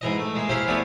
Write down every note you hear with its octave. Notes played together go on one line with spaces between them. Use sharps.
G#2 E3 D#5
A3
G#3 A#3
E4 G4 G#4 C5 F5
E2 A3 B3 D5 G#5